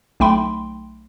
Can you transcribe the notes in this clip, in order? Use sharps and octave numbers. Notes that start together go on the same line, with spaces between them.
B1 A3 G5 B5 C6